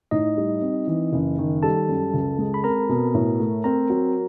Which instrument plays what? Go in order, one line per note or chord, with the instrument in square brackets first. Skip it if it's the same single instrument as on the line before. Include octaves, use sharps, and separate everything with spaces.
[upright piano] A2 [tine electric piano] D#4 D#5
[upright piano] G3
C4
E3
F#1
D#3
[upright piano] G3 [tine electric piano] A4 A5
[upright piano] F#2
C#2
G#3
[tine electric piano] B5
[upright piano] C4 [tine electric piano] A#4 A#5
[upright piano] B2
A2
A3
[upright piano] C4 [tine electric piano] A#4 A#5
[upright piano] F#3